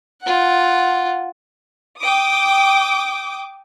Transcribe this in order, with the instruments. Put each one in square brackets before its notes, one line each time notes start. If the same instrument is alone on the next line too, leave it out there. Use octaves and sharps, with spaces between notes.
[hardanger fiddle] F4 F#5
[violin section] G5 D6 D#6